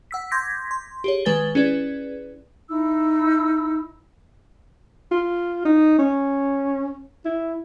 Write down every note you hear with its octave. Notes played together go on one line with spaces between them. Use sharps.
F#5 E6 B6
C6 D6 G6 G#6 A#6 B6
C6
G4 G#4 C#5
D#3 G#3 B4 G#5 A6 G7
C#4 E4 G#4 B4 D5
D#4 E4 E6
F4
D#4
C#4
E4